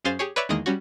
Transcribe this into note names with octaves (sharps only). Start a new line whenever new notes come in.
F#2 C#4 G#4 C5 F5 A6
G4 G#4 C#5
B4 C#5 D5 E5 B5 C#6
E2 D#3 G#3 A#3 D#5 A#6
G3 C#4 F#4